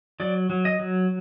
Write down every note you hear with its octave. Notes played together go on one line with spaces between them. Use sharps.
F#3 D5
F#3
D#5
F#3